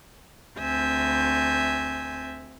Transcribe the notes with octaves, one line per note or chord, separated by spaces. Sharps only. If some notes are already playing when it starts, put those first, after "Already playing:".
D2 C4 E5 G#5 G6